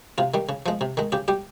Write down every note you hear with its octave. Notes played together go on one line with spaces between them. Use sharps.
C3 F4
D#3 G3
C#3
F3 G#3
C3
D#3 G#3
C#3 G4
G3 G4